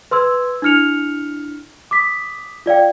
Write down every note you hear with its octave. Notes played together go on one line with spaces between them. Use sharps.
B4 C6 E6 G#6
D4 E4 F6 C#7 F7
D6 D#6 B6
F4 D5 F5 G5